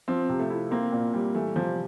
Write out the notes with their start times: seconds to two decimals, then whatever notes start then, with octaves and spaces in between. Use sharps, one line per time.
0.08 F3 C4
0.29 C3
0.40 A3
0.50 E4
0.71 A#3 C4
0.92 A#2
1.14 G3
1.35 E3 A3
1.56 C3 F3